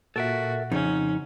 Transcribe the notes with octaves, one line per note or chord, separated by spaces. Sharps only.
A#2 F#4 A4 A#4 E5
F2 C#3 C#4 D#4